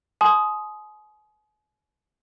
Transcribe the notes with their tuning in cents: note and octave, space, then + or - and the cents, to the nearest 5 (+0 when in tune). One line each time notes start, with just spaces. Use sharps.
G#5 +40 C6 -10 D#6 +0